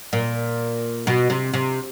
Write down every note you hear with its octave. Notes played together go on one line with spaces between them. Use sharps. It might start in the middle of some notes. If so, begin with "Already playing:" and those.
A#2
B2
C3
C3